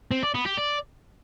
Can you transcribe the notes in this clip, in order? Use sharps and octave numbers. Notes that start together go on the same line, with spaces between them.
C4
D5
B3
G4
D5